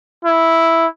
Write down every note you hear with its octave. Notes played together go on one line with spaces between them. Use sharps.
E4